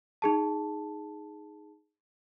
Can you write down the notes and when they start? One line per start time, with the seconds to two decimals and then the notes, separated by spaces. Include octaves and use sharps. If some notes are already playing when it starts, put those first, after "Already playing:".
0.22 D#4 G#4 A5